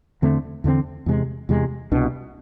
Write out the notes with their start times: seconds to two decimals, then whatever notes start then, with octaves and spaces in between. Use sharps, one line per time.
0.22 E2 D3 A3 C4
0.64 E2 D3 A3 C4
1.06 E2 C3 G#3
1.49 E2 C3 G#3
1.92 C2 B2 B3 D4